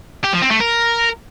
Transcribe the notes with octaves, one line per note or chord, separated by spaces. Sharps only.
G4
F3
C4
A3
A#4